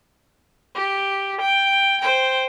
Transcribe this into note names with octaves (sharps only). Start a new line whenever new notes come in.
G4
G5
C5 G5